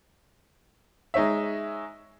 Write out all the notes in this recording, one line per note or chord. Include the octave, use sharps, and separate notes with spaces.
G#3 D#4 C#5 E5